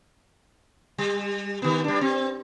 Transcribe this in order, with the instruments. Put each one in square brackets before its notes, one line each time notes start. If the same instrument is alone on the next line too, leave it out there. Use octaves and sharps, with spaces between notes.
[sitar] G3
D#3 B3
G3 D4
C4